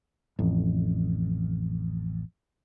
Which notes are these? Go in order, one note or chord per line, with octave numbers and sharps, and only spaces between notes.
A1 F2